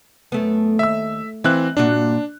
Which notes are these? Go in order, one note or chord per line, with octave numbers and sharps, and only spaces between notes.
F#2 A3 B3
D#2 E5 E6
E3 C4 E5 F5 F#6
G2 A#2 D4 F#4